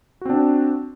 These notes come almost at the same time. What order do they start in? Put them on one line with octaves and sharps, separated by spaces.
F#4 C4 D4